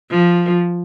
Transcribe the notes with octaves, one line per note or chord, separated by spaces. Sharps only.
F3